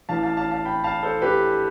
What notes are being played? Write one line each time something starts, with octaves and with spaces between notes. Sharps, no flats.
A1 A2 E3 F5 A5
F5 A5
F5 A5
F5 A5
G5 B5
F5 A5
A4 C5
G4 B4